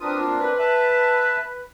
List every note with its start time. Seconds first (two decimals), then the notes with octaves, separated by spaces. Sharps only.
0.01 C4 D4 F4 A#4 B4 D#6
0.18 A#3 B3 F4
0.40 B4
0.59 E5 A5